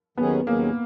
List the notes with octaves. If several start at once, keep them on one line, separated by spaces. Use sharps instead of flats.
D#2 D#3 F#3 B3 C#4 G#4
D#2 D#3 F#3 A#3 C#4 G#4